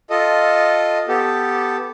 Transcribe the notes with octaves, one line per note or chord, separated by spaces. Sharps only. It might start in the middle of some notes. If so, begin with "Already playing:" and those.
F4 A4 D#5
B3 G4 A4